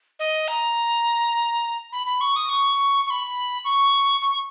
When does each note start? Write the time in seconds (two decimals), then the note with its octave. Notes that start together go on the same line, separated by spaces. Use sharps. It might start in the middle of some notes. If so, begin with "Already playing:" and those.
0.19 D#5
0.48 A#5
1.93 B5
2.07 B5
2.21 C#6
2.36 D#6
2.49 C#6
3.07 C#6
3.10 B5
3.65 C#6
4.22 C#6